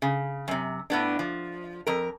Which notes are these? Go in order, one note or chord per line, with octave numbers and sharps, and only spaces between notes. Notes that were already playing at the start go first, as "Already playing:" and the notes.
C#3
F#2 C3
A2 B3 D4
F3
F2 A#4